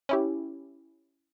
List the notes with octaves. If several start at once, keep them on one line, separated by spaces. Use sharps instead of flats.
C#4 E4 G4